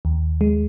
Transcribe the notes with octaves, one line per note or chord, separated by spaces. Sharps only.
D#2
G#3